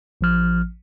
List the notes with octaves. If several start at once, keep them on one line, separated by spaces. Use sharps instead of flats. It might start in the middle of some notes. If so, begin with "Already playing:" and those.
A1 F3 F6